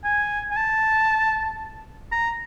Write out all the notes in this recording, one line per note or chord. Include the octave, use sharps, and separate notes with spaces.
G#5
G#5
A5
A#5